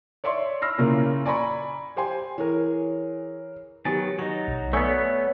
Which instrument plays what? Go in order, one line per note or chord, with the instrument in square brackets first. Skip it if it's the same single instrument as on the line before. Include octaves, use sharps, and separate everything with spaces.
[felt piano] C#5 D5 E5 C6 C#6
B5 E6 F6 A#6 C7
A#2 C#3 A#3 C#4 E4
D5 G#5 A#5 B5 C#6
G4 C5 G5 G#5 C6
[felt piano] E3 A#4 [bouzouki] G#4 C#5
[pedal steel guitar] D#3 F#3 B3 [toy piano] G4 G#5 [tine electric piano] A6
[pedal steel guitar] F#3 D#4 [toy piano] C#6
[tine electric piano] B1
[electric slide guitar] A3 B3 [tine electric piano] C#5 [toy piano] D5 G#5 D#6